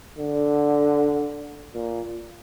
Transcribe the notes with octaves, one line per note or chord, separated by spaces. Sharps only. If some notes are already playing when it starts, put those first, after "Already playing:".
D3
A#2